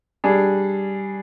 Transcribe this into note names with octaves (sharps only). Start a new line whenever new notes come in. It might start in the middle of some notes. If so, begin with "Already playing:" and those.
G3 D4 G#4